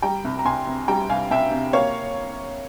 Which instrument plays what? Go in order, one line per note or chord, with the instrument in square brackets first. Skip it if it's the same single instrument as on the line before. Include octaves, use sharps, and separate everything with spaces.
[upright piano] G3 G5 A#5
C2
A#5
C2 G#5 C6
C3
G3 G5 A#5
C2 F5 G#5
C2 E5 G5
C3
A#3 C#5 F5